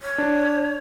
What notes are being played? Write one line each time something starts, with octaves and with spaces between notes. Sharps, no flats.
C#5
D4